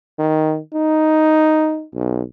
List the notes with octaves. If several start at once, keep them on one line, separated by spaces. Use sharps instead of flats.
D#3
D#4
B1